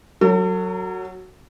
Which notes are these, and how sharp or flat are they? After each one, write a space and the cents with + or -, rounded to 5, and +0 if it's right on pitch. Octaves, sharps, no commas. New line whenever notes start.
F#3 +0 A4 +45